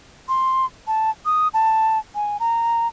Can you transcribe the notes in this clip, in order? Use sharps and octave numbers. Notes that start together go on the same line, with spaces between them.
C6
A5
D#6
A5
G#5
A#5